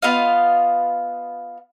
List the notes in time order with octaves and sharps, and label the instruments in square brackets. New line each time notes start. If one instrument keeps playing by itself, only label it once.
[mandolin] B3 F4 D#5 F5